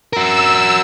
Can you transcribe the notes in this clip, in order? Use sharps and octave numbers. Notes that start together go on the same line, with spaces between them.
F#4 A#4 E6